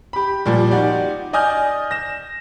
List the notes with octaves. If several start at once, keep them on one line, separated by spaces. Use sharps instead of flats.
G4 B5
A#2 F3 G3
D#4 F#4 G4 D5
D5 D#5 G#5 D#6 F6 G6
A#6 E7